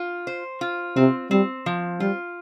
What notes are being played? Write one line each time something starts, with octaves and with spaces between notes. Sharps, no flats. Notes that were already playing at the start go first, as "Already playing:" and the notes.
Already playing: F4
C5
F4
C3 C4
G3 C4
F3
G3 F4